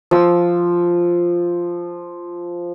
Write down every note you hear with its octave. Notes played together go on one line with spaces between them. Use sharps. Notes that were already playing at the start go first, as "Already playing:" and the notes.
F3 E6